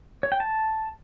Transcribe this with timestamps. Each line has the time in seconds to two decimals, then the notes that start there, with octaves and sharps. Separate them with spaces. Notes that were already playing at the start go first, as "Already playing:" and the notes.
0.23 C#5
0.32 G5
0.40 A5